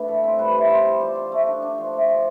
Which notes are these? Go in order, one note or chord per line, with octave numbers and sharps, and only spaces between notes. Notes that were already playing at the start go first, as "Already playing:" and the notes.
Already playing: A3 D4 B4
A2 A4
C4
G3 B4
E4
C4 C5
G3
F3 D5
F3
A3
D4
D4
F3
A3
F3